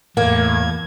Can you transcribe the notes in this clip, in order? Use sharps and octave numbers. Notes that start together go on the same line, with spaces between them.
E2 A2 A#3 G#6